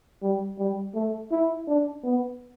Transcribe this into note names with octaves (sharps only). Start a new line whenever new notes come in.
G3
G3
A3
E4
D4
B3